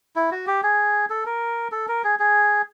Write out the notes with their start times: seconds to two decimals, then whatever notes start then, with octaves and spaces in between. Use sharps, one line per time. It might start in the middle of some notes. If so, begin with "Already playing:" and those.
0.16 E4
0.32 F#4
0.47 G4
0.63 G#4
1.10 A4
1.26 A#4
1.72 A4
1.88 A#4
2.04 G#4
2.19 G#4